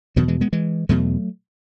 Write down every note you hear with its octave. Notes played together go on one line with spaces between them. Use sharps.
E2 B2 D#3 F#3
E3 G#3
G#3 B3
E3 G#3
E2 B2 F#3 A3